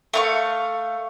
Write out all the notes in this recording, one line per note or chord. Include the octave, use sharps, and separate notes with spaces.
A3 F5 C#6